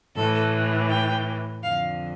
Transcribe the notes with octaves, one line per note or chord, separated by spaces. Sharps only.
A2 E3 A4
G5
F2 D3 F5